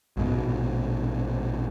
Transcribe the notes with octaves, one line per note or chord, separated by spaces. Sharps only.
A#1 G#2 B2